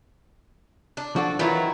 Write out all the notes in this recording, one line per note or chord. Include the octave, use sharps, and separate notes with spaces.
D4
F3 D4 F#4 A4
D#3 E3 F#3 E4 F4